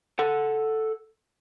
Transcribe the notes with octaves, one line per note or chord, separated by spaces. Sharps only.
A4 F#5